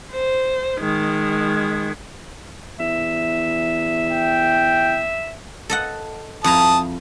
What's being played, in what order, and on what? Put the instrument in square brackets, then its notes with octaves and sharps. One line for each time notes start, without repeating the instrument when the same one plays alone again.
[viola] C5
D#3 G#3
[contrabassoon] E2 [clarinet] E5
[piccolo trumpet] G5
[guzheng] A4 D#5 F#5
[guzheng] F2 E4 A#5 [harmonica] A5 D#6